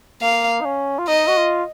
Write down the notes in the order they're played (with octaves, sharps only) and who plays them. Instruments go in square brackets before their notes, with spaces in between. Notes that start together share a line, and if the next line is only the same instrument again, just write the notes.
[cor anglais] A#3 [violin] F5
[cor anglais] D#4
C#4
F4
[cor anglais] D#4 [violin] D#5
[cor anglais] F#4
F4